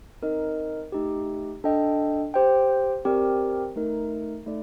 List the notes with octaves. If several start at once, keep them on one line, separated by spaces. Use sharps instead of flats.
C4 D#4 A#4 D#5
A3 D#4 G4
D4 A4 D#5 G5
G4 C5 G5
C4 G4 A#4 D5
A3 D#4 A#4
A3 D#4 A4 D5